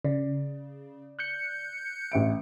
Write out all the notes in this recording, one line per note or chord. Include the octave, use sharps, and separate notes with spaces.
C#3 D5
F#6 G6 C#7
A1 E5 D7